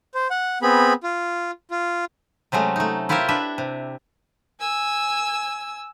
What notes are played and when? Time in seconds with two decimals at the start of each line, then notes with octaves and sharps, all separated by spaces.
0.15 C5
0.31 F#5
0.62 B3 C4 G#4 B5
1.04 F4
1.71 F4
2.52 C3 F#3 G#3 A3 C#4
2.76 A3 D#4
3.09 E4 F4 G4 A#4 C5 E5
3.29 D4 B4 E5
3.58 C3
4.60 G#5 E6